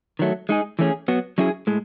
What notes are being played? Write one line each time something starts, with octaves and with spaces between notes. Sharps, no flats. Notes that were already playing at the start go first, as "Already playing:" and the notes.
D#3 F#3 A3
G#3 D#4 G#4
E3 A3 C#4 G#4
F#3 B3 F#4
F#3 C#4 E4 G#4
A2 G#3